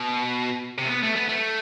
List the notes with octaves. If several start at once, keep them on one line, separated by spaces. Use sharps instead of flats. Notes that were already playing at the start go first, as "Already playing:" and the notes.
Already playing: B2
C3
A3
B3
A3
B3
A3